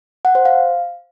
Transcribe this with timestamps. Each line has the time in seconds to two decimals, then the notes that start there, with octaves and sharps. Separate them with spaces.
0.25 F#5
0.35 C5
0.45 F5